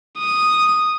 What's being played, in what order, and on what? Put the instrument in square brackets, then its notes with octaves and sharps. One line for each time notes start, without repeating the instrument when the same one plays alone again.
[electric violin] D#6